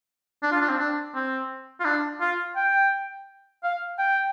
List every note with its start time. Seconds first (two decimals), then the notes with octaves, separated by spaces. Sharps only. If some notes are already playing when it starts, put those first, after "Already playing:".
0.43 D4
0.52 F4
0.61 D4
0.70 C4
0.78 D4
1.15 C4
1.80 F4
1.85 D4
2.21 F4
2.56 G5
3.64 F5
3.99 G5